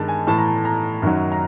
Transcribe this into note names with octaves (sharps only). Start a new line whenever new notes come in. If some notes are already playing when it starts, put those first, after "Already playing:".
Already playing: G2 D#3 G#3 A5
G#5
A2 E3 A3 A5
A#5
A5
A#5
F#2 D#3 F#3
A#5